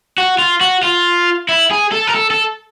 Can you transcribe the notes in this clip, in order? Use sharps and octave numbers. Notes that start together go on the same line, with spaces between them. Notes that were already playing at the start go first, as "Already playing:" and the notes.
F#4
F4
F#4
F4
E4
G#4
A4
A#4
A4
A4